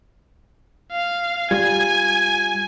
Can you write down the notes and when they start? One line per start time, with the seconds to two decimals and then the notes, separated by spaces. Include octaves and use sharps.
0.92 F5
1.51 G3 F4 G#5 G#6